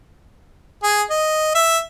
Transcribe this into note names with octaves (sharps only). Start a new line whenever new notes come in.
G#4
D#5
E5